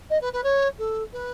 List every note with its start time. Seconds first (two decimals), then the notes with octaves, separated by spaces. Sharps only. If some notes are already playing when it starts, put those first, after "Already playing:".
0.10 D#5
0.21 B4
0.33 B4
0.43 C#5
0.78 A4
1.13 B4